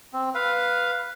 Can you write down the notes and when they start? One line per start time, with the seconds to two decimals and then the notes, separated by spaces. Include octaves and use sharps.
0.13 C4
0.34 B4 F5